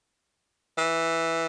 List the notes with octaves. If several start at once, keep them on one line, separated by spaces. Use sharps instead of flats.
E3